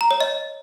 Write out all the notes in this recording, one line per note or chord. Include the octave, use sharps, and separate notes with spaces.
A#5
C#5
D#5